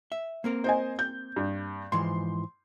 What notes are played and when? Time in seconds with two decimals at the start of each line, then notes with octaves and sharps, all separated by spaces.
0.12 E5
0.44 A#3 C4 A#4
0.64 C5 D#5 G#5
0.99 G6
1.36 G2
1.92 G#2 E3 F3 C6